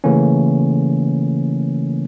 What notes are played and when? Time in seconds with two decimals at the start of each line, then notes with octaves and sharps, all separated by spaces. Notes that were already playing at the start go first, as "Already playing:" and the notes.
0.04 C#3 E3 A3 A#3 C#4